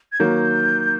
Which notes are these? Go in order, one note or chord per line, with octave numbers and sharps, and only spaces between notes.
G#6
D#3 F#3 A#3 G6